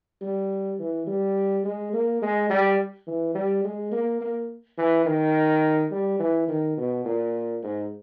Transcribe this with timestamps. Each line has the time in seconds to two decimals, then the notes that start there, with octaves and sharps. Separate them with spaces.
0.21 G3
0.79 E3
1.07 G3
1.64 G#3
1.93 A#3
2.22 G#3
2.50 G3
3.07 E3
3.35 G3
3.64 G#3
3.92 A#3
4.21 A#3
4.78 E3
5.05 D#3
5.91 G3
6.19 E3
6.48 D#3
6.77 B2
7.05 A#2
7.63 G#2